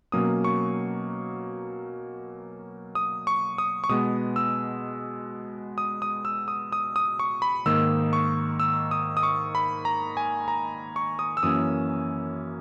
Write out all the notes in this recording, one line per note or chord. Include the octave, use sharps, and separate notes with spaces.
B2 F#3 A#3 C#4 D#6
C#6
D#6
C#6
D#6
C#6
B2 G#3 B3 D#6
E6
D#6
D#6
E6
D#6
D#6
D#6
C#6
B5
G#2 D#3 A#3 E6
C#6
E6
D#6
D#6
C#6
B5
A#5
G#5
A#5
C#6
D#6
E6
F#2 E3 A#3 C#4 D#6